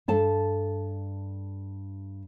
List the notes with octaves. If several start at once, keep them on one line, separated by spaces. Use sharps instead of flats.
G2 A4 A5